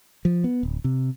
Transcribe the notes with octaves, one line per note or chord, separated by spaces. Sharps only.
F3
B3
D1
C3